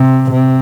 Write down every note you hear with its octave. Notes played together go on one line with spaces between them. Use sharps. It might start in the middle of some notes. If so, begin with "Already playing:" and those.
Already playing: C3
C3